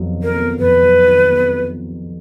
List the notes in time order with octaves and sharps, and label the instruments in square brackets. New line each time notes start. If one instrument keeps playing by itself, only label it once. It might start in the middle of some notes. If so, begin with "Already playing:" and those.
Already playing: [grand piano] F2 D#3 F#3 B3
D#3
[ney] A#4
[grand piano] B3
[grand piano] F2 [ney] B4
[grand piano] F#3
D#3
B3